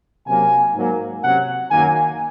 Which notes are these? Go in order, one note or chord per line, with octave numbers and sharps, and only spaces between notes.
C3 F#3 A#3 C#4 G#5
G#2 F#3 A#3
C3 F#3 C#4 F#5
F#2 D#3 F#3 A#3 G#5